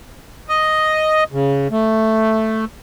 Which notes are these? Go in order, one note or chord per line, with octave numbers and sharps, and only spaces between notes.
D#5
C#3
A3